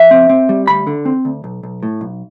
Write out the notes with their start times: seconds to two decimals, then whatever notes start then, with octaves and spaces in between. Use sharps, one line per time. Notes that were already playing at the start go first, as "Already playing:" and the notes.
Already playing: F2 E5
0.11 C4
0.29 C4
0.49 G3
0.67 D2 B5
0.87 D3
1.05 C4
1.25 D2
1.44 B1
1.63 B1
1.83 A2
2.01 B1